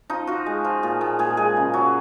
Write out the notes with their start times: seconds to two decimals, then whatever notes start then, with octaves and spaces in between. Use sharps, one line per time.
0.10 F3 D#4
0.27 F3 F#4
0.46 G#3
0.64 F3
0.83 A#2
1.01 A#2
1.19 A#2 G#4
1.37 G#3 G#4
1.57 C#3
1.74 F#3